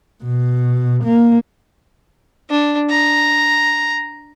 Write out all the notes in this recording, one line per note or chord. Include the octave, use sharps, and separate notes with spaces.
B2
A#3
D4
A#5